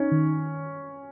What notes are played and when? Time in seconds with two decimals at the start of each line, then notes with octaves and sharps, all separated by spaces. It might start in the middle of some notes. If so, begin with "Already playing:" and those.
Already playing: C#4 D#4
0.12 D#3